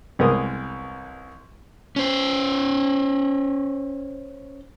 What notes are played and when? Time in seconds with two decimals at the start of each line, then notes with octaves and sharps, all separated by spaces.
0.19 C2 G#3 B3 A#4 D#6
1.96 C#4 C5